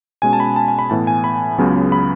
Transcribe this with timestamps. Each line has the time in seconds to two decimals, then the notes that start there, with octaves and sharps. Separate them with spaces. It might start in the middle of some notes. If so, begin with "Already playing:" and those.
0.22 B2 G#3 C#4 G#5
0.33 A5
0.40 B5
0.56 A5
0.68 G#5
0.79 B5
0.90 A2 E3 B3 A5
1.07 G#5
1.24 B5
1.58 C#2 C#3 F#3 B3
1.92 B5